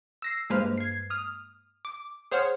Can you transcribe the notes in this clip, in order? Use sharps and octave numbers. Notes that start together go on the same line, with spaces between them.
E6 A#6 C7
G2 G#3 A#3 B4 C5 F6
G#6 C7
D#6 F6
D6
G#4 C5 C#5 F#5 F6